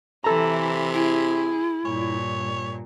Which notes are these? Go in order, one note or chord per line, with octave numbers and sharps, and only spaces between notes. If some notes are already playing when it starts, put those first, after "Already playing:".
C3 E3 E4 A4 A#5
E4 G#4
G2 A#2 C#5